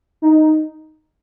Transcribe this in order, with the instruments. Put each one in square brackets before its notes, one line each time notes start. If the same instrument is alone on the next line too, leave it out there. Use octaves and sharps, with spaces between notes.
[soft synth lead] D#4